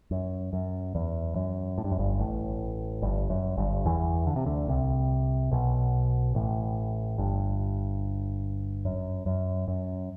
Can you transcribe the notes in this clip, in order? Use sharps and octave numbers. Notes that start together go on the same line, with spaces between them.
F#2
F#2
E2
F#2
A2
G2
F#2
G1 G2
A1 A2
G1 G2
F#2
G1 G2
E2 E3
D3
C3
D2 D3
C2 C3
B1 B2
A1 A2
G1 G2
F#2
F#2
F#2